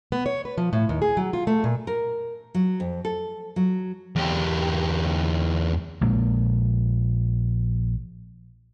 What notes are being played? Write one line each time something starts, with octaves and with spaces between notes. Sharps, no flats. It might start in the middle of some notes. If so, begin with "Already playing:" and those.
B3
C#5
B4
F3
A2
D#2
G#4
F#3
F4
A3
A#2
A#4
F#3
F2
A4
F#3
E2 G4
A#1 A#2 G#3 A#3